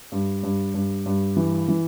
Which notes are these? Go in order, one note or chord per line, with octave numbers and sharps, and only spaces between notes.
G2
G2
G2
G2
E3
E3